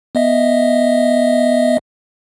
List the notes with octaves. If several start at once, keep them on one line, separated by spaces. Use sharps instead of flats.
B3 D#5 E5